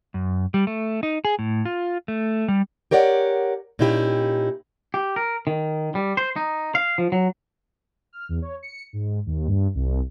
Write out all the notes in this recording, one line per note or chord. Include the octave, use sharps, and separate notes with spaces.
F#2
G3
A3
D#4
G#4
A2
F4
A3
G3
G4 A#4 C#5 D5 F#5
A#2 C#4 D#4 E4 G4
G4
A#4
D#3
G3
C5
D#4
F5
F3
F#3
F6
E2
C#5
C#7
G#2
D#2
G2
C2